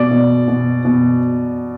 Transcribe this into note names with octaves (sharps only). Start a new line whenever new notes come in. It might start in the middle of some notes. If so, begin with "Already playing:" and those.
Already playing: B2 D5
B2
B2
B2